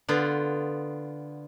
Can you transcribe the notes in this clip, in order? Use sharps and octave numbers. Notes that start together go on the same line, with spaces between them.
D3 B3 F4